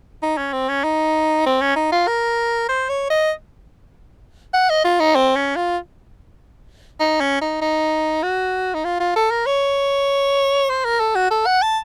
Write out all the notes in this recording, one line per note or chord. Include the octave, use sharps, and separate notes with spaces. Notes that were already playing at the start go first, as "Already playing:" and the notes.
D#4
C#4
C4
C#4
D#4
C4
C#4
D#4
F4
A#4
C5
C#5
D#5
F#5
D#5
F4
D#4
C4
C#4
F4
D#4
C#4
D#4
D#4
F#4
D#4
F4
F4
A4
A#4
C#5
C5
A#4
A4
F#4
A4
F#5
A5